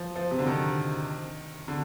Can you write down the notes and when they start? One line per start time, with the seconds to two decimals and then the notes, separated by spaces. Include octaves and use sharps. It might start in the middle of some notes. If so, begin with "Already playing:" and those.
Already playing: F3
0.16 F3
0.31 C3
0.39 D3
0.46 D#3
1.68 D3